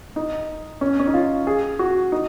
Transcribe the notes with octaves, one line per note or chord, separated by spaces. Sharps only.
D#4
C#4
C#4
D#4
F4
G#4
F#4
D#4